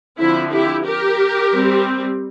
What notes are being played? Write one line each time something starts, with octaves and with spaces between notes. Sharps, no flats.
D3 F3 C4 E4
E4 G4
G4 A#4
G3 C4